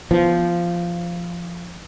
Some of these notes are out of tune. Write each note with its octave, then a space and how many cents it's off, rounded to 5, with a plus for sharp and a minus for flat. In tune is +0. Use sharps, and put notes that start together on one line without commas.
F3 -10 B3 +0